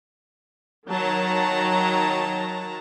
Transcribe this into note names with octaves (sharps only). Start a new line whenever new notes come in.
D#3 F#3 A5 A#5